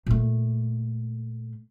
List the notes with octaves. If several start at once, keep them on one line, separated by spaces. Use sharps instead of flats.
A#2 A3